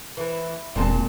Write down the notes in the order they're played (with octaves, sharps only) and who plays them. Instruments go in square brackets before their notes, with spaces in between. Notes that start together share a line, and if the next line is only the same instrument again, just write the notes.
[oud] E3
[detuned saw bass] E1 [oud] A#2 [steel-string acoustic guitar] G#3 C4 A5